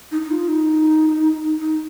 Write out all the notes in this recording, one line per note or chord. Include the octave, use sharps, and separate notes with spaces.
D#4
D#4
F4
D#4
D#4